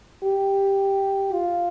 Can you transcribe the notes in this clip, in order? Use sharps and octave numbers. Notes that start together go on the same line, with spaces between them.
G4
F4